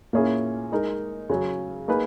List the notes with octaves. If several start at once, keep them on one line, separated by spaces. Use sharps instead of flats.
A#2 A#3 C#4 E4 G#4
G#3 D#4 A#4
C#3 F#3 C#4
A#3 D#4 G#4 B4